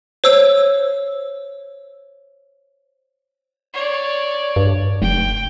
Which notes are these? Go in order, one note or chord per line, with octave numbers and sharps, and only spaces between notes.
C5 C#5 E6
C#5 D5
G2
F1 G5